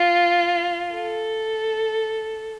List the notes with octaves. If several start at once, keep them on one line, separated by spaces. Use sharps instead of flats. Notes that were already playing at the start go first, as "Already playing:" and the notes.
Already playing: F4
A4